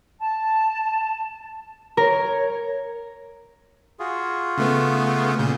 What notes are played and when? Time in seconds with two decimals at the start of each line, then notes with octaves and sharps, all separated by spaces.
0.19 A5
1.97 A#4 C#5
4.00 F4 F#4 G#4
4.58 C#3 A3 B3
5.39 A#2 C#3 G6